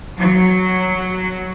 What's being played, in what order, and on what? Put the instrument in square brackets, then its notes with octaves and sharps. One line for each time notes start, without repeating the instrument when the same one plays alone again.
[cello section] F#3